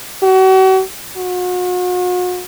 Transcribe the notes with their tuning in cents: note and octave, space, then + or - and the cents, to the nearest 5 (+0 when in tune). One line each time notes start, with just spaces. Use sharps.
F#4 +40
F#4 -40